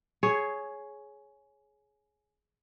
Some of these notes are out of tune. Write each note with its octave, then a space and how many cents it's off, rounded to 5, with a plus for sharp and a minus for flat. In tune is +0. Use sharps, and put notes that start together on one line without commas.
G#4 +15 C#5 +0